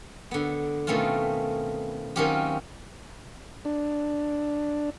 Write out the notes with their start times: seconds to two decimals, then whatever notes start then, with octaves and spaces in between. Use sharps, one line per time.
0.31 D3 B3
0.87 B2 D#3 A3 C4 C#4 F4
2.16 D#3 F#3 C4 C#4 F4 G4
3.65 D4